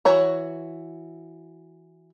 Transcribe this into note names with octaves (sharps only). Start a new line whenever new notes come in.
E3 F#4 C#5 A#5